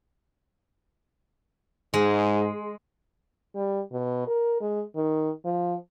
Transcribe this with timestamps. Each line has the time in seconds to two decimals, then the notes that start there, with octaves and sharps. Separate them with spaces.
1.94 G#2 G#3
3.55 G3
3.92 B2
4.27 A#4
4.61 G#3
4.95 D#3
5.45 F3